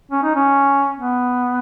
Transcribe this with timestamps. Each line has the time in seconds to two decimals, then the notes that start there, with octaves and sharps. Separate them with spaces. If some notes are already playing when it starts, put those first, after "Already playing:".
0.11 C#4
0.23 D#4
0.35 C#4
0.97 B3